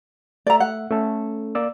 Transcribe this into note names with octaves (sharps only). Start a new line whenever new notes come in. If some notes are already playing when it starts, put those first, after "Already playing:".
A3 D5 E5 A#5
F#5
A3 C#4 A4
A#3 D5 E6